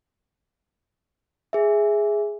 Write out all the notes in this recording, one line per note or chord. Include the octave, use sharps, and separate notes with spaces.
G#4 E5